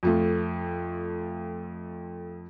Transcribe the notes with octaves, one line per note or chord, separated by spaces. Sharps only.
F2 F3 A3